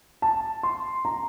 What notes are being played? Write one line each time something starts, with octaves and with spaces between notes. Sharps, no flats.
A5
C6
A#5